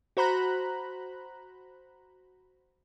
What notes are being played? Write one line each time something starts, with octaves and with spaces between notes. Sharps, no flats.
F#4 C5 A#5 B5 F#6